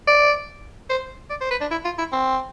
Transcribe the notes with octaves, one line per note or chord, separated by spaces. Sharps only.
D5
C5
D5
C5
B4
D4
E4
F4
E4
C4